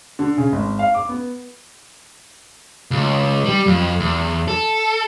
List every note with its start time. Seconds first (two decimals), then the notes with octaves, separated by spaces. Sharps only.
0.19 D3
0.37 C#3
0.52 G#1
0.79 F5
0.95 D6
1.09 B3
2.91 C#2
3.46 G3
3.67 F2
4.00 E2
4.48 A4